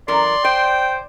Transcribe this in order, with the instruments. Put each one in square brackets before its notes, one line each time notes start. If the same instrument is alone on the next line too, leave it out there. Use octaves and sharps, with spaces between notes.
[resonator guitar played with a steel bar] F#2 E3 A#4 [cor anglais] D5 [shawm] C6
[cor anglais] C5 [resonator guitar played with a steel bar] D5 [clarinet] G5